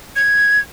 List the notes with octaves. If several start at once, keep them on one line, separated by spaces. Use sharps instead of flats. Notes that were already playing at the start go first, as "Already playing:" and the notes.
G#6